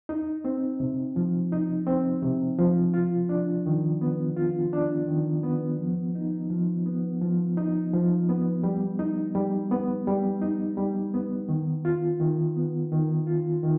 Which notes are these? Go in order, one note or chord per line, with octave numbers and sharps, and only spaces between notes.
D#4
C4
C3
F3
D#4
C4
C3
F3
F4
D4
D#3
B3
F4
D4
D#3
B3
F3
D#4
F3
B3
F3
D#4
F3
B3
G3
D#4
G3
B3
G3
D#4
G3
B3
D#3
F4
D#3
B3
D#3
F4
D#3